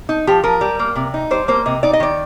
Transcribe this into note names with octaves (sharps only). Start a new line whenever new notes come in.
D#4
F3 G4
F3 A#4
G3
A#3
C3
D#4
G3 C5
A#3 C5
C3 D#5
D#4 D5
D#5
D#3 D5